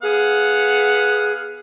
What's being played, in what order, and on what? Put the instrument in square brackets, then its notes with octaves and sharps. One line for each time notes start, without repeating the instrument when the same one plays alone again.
[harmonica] B3 F5 F#5 [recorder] G#4